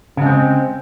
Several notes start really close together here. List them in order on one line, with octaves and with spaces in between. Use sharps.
C#3 G#3 C4